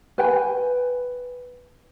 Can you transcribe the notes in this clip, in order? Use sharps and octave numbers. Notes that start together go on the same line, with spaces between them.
B4 G5 G#5